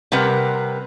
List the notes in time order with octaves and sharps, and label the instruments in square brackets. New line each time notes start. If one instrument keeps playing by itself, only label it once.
[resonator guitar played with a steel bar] C3 G3 A#4 B4 F#5